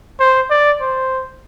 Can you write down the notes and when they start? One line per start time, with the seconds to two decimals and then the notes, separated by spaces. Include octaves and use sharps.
0.20 C5
0.50 D5
0.81 C5